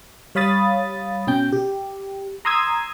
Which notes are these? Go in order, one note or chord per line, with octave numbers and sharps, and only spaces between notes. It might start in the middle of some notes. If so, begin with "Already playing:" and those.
G3 C#5 F5 B5 D#6 A6
B2 C#4 G5 G6
G4
A#5 C6 D#6 E6 G#6